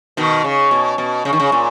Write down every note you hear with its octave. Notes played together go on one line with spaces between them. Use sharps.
B2 D#3
C#3
B2
B2
C#3
D#3
C#3
A#2